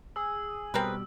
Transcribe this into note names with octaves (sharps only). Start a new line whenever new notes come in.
G#4 E6
B2 G3 C4 A#4 B4